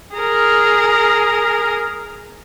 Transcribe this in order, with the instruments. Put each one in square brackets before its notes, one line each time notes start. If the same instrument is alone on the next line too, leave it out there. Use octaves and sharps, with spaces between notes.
[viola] G#4 A#4